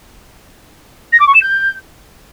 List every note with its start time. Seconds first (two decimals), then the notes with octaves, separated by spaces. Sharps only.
1.12 A#6
1.20 D6
1.27 C#6
1.34 E7
1.41 G6